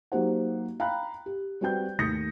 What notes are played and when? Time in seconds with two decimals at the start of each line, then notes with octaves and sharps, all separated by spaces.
0.12 F#3 A#3 D#4 G4 C5 F#5
0.80 F5 G5 A#5 B5 F#6
1.26 G4
1.61 G3 C4 F#4 B4 G5 G6
1.99 D#2 A3 D#6 G6 A#6 C#7